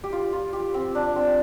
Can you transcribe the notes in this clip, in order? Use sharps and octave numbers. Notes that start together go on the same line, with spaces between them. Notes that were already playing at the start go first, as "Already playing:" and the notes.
G4
F4
F4
G4
C4
D4
C4